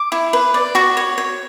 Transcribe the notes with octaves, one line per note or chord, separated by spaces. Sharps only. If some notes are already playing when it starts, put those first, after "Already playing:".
Already playing: D6
E4
B4
D5
F#4 C#6
C#5
C#5